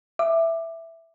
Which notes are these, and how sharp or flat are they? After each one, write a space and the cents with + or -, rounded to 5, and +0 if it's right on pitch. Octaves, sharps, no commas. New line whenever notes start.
E5 +0 D6 +15